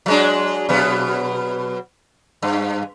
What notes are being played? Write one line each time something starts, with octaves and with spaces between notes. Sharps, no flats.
F#3 G#3 D4
B2 F#3 B3
G2